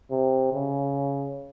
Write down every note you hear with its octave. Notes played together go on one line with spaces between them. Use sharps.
C3
C#3